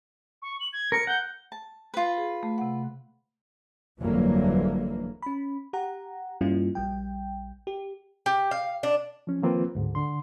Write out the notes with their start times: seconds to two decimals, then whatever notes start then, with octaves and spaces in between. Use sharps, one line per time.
0.42 C#6
0.60 F#7
0.72 G#6
0.92 A#4 C#7
1.07 F#5 G6
1.52 A5
1.94 F4 B4
2.18 G#4
2.43 A3
2.58 C3 F#5
3.99 G1 F2 E3 F#3 A#3
5.22 C#4 B5
5.73 G4 F#5 A#5
6.41 G2 G3 A#3 C#4 E4 F4
6.75 A#1 G3 G5
7.67 G4
8.26 G4
8.51 F5
8.83 D4
9.27 F3 C#4
9.42 D#3 F3 A#3 C4 F4 B4
9.75 D2 G#2 D3
9.95 D3 C6